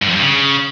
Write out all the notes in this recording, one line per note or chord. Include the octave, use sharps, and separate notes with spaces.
G2
F2
G2
C#3